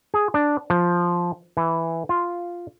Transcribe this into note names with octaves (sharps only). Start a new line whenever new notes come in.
G#4
D4
F3
E3
F4